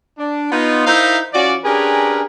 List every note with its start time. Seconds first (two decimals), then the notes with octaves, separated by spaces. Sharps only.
0.18 D4
0.52 B3 D#4 F4
0.86 D#4 E4 A#4 C5 E5 F5
1.34 E3 C#4 F4 F#4 D5
1.65 C#4 D4 G4 G#4 A#4 B4